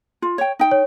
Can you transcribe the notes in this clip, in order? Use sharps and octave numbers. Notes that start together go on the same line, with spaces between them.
F4
C#5 G5
D#4 G5
C#5